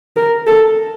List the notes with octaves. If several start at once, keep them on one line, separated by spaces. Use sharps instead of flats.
A#4
A4